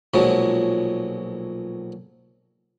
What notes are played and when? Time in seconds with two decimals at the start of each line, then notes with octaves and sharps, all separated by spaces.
0.14 B1 A#2 F3 F#3 G#3